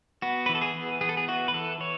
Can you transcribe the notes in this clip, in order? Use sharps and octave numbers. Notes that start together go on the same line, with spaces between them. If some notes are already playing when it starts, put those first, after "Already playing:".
B3 F#4
B4
E3
A4
G#4
B3
B3 G#4
A4
G#4
E3 F#4
B4
E3 A4
E3 C#5